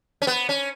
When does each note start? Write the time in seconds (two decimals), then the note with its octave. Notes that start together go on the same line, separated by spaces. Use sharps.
0.22 C#4
0.27 B3
0.49 C#4